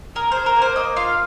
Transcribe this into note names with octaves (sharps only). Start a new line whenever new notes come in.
G#4 A#4
G#4 C5
A#4
A#3
C5
A#3 D#5
F4 F5